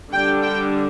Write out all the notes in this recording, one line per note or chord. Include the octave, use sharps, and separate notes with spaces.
D3 G3 D4 G5
G5